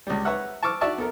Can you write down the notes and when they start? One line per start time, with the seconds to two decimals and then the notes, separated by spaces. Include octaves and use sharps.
0.07 C#2 G3
0.25 B4 C#5 E5 F#5
0.63 A5 C#6 D6 E6 F6
0.81 F#4 D5 E5 A5 C#6
0.98 B3 A4 A#4